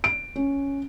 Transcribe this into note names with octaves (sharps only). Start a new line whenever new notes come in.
D7
C#4